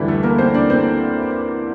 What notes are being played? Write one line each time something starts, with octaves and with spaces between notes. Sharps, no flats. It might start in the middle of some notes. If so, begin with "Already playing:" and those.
Already playing: D2 D3 E3 G3 D4 E4
A3 A4
A#3 A#4
C4 C5
D4 D5
C4 C5